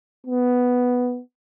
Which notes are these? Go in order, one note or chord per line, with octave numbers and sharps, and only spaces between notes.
B3